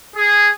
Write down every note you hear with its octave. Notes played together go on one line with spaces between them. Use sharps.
G#4